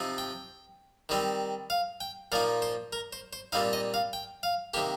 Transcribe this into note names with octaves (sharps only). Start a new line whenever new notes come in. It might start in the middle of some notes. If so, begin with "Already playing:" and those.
Already playing: C3 F3 C4 D#4
G5
D#3 G3 C4 D#4
F5
G5
A#2 F3 A#3 D#4 F5
C5
A#4
C5
C5
A#2 G3 C4 D#4 F5
D#5
F5
G5
F5
C3 D#3 A#3 G4